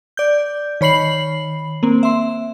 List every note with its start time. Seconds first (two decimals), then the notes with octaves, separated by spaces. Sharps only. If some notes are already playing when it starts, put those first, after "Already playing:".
0.17 D5 G6
0.81 D#3 C#5 B5 C7 F#7
1.83 A#3 C4
2.03 E5 C6